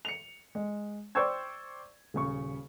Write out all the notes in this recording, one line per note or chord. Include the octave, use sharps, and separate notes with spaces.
C#7 F7
G#3
C5 D5 G5 C#6 E6 G#6
D#1 C#3 C#6